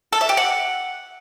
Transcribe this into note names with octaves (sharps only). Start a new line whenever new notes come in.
A4
E5
G4
F#5